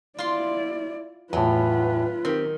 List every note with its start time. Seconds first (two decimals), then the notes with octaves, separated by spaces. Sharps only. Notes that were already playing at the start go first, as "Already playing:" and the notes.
0.19 E4 F4 D5 C6
1.33 E2 A2 F#3 F4 B4
2.25 D#3 C4 G4